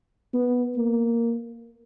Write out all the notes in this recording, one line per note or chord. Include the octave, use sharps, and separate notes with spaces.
B3
A#3